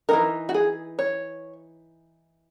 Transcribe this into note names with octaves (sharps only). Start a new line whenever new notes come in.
E3 G#3 D#4 A#4
F#4
G#4
C#5